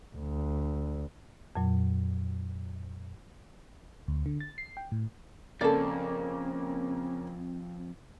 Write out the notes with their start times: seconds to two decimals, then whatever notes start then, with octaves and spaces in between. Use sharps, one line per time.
0.16 D2
1.55 F2 A#2 F#3
4.08 D2
4.26 D3
4.40 A6
4.58 C7
4.77 G5
4.92 A2
5.61 F2 C#3 A#3 C4 A4 D5